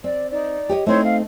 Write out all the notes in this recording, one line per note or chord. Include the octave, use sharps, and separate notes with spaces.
C4 D5
D#4 D5
G4 C#5 D#5
A3 C4 D#4 E4 C5 C#5
F5